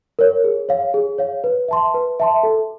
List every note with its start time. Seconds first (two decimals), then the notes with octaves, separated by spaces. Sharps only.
0.19 A#4 C#5
0.44 G#4
0.69 C#5 F5
0.94 G#4
1.18 C#5 F5
1.44 B4
1.68 E5 A5 C6
1.94 B4
2.20 E5 A5 C6
2.43 A4